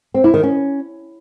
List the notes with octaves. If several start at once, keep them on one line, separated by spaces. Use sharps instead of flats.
C4
E4
D#3
C#4